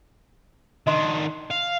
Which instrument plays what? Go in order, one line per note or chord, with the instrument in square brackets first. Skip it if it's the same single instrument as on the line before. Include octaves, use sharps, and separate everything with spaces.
[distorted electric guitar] D#3 D4 [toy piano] D#5 C6
[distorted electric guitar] F5